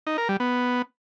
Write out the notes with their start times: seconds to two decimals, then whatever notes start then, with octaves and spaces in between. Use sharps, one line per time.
0.07 D#4
0.18 A#4
0.29 G3
0.40 B3